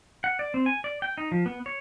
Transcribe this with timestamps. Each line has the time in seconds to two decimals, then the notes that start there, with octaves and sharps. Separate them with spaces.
0.24 F#5
0.39 D5
0.54 C4
0.66 G#5
0.84 D5
1.02 G5
1.18 D#4
1.31 F3
1.46 B3
1.66 C#5